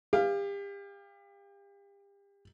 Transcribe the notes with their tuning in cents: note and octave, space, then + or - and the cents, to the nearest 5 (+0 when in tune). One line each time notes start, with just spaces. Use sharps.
G4 +35 F5 +0